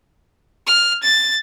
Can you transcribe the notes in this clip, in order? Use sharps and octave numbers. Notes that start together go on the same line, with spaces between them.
F6
A6